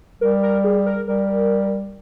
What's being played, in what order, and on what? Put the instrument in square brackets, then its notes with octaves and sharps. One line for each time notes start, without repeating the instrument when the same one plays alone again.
[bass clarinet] G3 [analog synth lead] A#4
[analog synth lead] A#4
G#4
A#4
[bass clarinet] G3 [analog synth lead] A#4